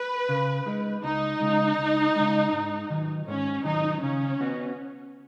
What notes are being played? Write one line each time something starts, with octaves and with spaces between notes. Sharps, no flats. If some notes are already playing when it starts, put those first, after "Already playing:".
Already playing: B4
C#3
G#3 D#4
C#2 D#4
C#3 G#3
C#2
C#3 G#3
G#2
D#3 F#3
G#2 C#4
D#3 F#3 D#4
C#3 C#4
B3 F#4